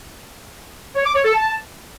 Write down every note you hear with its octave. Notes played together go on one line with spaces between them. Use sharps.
C#5
D6
C#5
A4
A5